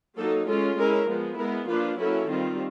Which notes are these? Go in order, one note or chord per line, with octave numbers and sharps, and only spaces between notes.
F#3 A#3 D#4 A4
G#3 C#4 F4 A4
G#3 C#4 E4 A#4
F3 G#3 B3
G#3 B3 E4 A#4
F3 A#3 D4 F4 B4
F#3 A#3 C#4 E4 A4
D#3 G3 C4 F4